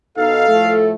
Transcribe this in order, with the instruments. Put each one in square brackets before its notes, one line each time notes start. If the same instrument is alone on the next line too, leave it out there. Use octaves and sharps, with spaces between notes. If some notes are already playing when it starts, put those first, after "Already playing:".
[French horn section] B2 D#4 [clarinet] A4 [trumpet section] F5
[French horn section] A2 F3 A3